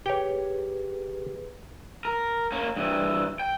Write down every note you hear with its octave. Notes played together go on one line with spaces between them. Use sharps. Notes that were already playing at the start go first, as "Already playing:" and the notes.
G4 G#4 B4 C#5 G5
A#4
A#3 C#4
G2 E3
G5